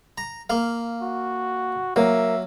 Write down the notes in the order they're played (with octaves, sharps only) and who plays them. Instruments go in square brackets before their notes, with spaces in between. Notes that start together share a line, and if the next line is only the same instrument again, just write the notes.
[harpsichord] A#5
A#3 F5
[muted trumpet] F#4
[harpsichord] F#3 [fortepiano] A#3 [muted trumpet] E5